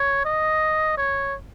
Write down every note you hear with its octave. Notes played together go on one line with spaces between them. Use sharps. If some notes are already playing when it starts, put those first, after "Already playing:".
Already playing: C#5
D#5
C#5